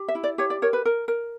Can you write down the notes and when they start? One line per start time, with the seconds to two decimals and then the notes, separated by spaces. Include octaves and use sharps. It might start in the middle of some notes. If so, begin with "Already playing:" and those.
Already playing: G4
0.08 E5
0.15 E4
0.24 D5
0.38 G4 C#5
0.50 D5
0.62 A#4 C#5
0.73 B4
0.85 A#4
1.08 A#4